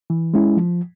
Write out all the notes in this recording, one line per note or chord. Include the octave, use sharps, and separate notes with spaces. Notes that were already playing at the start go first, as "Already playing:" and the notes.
E3
G#3 C#4 E4
F3